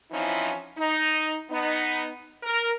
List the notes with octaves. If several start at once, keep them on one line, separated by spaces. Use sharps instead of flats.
E3 F3 C4 C#4 D#4 E4
D#4
B3 D#4
A#4